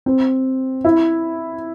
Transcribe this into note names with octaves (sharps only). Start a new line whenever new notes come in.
C4
E4